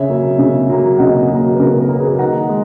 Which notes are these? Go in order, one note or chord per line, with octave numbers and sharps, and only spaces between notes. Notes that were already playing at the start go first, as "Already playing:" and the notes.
Already playing: C#3 C#5 E5
F#3 A#3
C#3
F#3 A#3
C#3 D#5 F#5
F#3 A#3
B4
C#3 A#4
A#4
F#3 A#3
G#4 B4
D#3 F#5 A#5
G#3